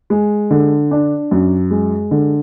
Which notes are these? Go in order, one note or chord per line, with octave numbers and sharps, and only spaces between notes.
G#3
D3
D4
F#2
G#3
D3